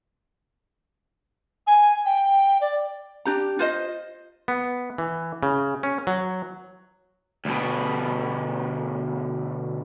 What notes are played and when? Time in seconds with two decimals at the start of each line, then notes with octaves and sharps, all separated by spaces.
1.67 G#5
2.05 G5
2.61 D5
3.25 D4 G4 A#5
3.59 F4 C5 D#5
4.48 B3
4.98 E3
5.43 C#3
5.83 C#4
6.07 F#3
7.45 D2 B2